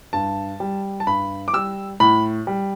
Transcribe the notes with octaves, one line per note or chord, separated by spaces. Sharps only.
G2 A5
G3
A5
G2 B5
D6
G3 E6
A2 B5
G3